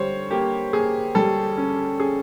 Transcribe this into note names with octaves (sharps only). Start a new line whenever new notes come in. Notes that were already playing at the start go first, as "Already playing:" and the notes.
Already playing: D3 G3 C5 C#5
A#3 G4
A#3 G#4
G3 A4
C#4
C#4 G#4